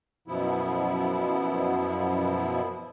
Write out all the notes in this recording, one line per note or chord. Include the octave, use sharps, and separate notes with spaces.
F#2 B2 F3 B3 E4